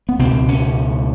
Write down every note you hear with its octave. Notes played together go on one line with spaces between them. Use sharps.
B3
C#2 B2 C4
C#4